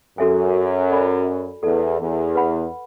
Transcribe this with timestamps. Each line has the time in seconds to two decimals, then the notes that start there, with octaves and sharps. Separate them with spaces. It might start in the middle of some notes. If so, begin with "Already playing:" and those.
0.18 F#2 F#4 A4 E5 G#5
0.91 A4 D5 G#5 B5
1.63 E2 A4 D5 A5
1.99 E2
2.35 B4 F#5 B5